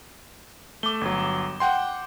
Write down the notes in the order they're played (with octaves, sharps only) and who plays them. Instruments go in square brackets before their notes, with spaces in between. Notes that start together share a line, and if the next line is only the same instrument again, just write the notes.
[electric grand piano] A3 [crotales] D6 G7
[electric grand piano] G1 F#3
F#5 G5 C6